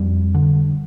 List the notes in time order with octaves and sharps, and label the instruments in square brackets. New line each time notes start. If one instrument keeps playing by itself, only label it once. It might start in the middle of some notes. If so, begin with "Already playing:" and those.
Already playing: [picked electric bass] F2 G3
D3